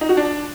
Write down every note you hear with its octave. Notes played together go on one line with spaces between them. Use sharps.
D#4
F#4
D4